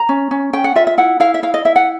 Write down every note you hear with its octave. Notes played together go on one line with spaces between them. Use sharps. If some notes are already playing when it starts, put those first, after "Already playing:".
Already playing: A#5
C#4
C#4
C#4 G5
F#5
F4 E5
E5
E4 F#5
E4 F5
E5
E4 F5
D#5
E4 E5
F#5